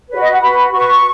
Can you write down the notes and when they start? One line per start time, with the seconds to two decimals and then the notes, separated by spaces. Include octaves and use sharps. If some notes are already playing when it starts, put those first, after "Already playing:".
0.09 B4 C#5
0.14 F#4
0.21 D#5
0.31 F#5
0.41 F#4 B4 B5
0.72 F#4 B4 C#6